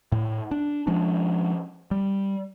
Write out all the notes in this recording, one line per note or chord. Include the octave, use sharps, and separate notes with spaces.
A2
D4
F3 G#3 C#4 D4
G3